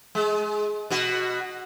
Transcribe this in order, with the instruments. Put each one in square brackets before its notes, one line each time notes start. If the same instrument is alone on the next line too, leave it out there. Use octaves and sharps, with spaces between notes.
[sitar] G#3
B2 F#4